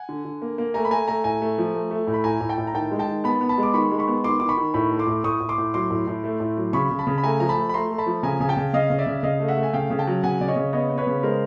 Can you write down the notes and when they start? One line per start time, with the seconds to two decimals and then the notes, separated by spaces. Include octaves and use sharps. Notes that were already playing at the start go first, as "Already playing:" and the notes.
Already playing: F#5 G#5
0.09 D3
0.25 D3
0.42 A#3
0.58 A#3
0.74 A3 G#5 A#5
0.85 B5
0.91 A3 G#5 A#5
1.07 A3 G#5 A#5
1.24 A2 G#5 A#5
1.41 A3
1.58 F3
1.74 A3
1.91 A3
2.07 A2
2.14 B5
2.24 A2 G#5 A#5
2.41 A2
2.49 G5 A5
2.58 A2
2.67 A#5
2.74 D#3 G5 A5
2.91 G#3
2.99 G5 A5
3.08 D#3
3.24 B3 A5 B5
3.41 B3
3.49 A5 B5
3.58 G#3 D6
3.74 D#3 B5 C#6
3.91 G#3
3.99 B5 C#6
4.08 B3
4.24 D#3 C6 D6
4.40 D#3 D6
4.49 B5 C#6
4.57 D#3
4.74 A2 B5 C#6
4.91 A3
4.99 C6 D6
5.07 A2
5.24 A2 C#6 D#6
5.40 A2
5.49 C6 D6
5.58 A2
5.74 F#3 C6 D6
5.90 A2
6.07 A2
6.24 A3
6.40 A2
6.57 F#3
6.73 C#3 B5 C#6
6.91 C#3
6.99 A5 B5
7.07 C#3
7.18 B5
7.23 A3 G#5 A#5
7.40 F3 A#5
7.49 A5 B5
7.57 A3
7.69 B5
7.74 A3 A#5 C6
7.91 A3
7.98 A5 B5
8.06 F3
8.23 C#3 G#5 A#5
8.40 C#3 G#5
8.49 G5 A5
8.57 C#3
8.73 C#3 D#5 F5
8.90 C#3
8.99 D5 E5
9.06 C#3
9.23 C#3 D#5 F5
9.40 A3
9.48 E5 F#5
9.57 A3
9.63 G#5
9.73 C#3 F5 G5
9.90 C#3
9.99 G5 A5
10.07 F#3
10.23 C#3 F#5 G#5
10.41 C#3 D5
10.48 C#5 D#5
10.56 C#3
10.73 B3 C#5 D#5
10.90 B3
10.98 B4 C#5
11.07 C#3
11.23 G#3 A#4 C5